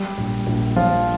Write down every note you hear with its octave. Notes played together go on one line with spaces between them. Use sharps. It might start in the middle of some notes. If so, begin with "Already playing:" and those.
Already playing: G3
A#1
A#1
A#2 F3 F4